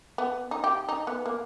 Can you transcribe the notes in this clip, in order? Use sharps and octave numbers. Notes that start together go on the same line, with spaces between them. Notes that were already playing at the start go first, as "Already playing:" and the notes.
B3
D#4
G4
D#4
B3
A#3